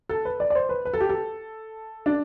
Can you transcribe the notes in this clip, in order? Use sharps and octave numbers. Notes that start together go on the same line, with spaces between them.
A4
B4
D5
D5
C5
B4
B4
A4
G4
A4
D4